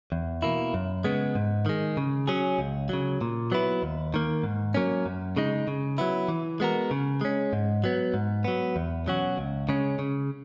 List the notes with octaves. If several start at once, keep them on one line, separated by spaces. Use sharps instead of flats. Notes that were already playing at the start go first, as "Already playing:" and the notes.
E2
B2 A#3 E4
F#2
C#3 G#3 B3
G#2
D#3 G#3
C#3
F#3 C#4 G#4
C#2
C#3 F#3
A#2
F#3 B3 E4 B4
D#2
D#3 A#3
G#2
F#3 A#3 C#4
F#2
C#3 G#3 D#4
C#3
F#3 B3 E4
E3
G#3 B3 F#4 A#4
C#3
G#3 C#4
G#2
F#3 B3
G#2
F#3 B3
E2
B2 F#3 C#4 F#4
C#2
C#3 G#3 C#4
C#3